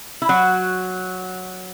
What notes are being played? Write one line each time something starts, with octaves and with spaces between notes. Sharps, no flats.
E4
F#3 F#4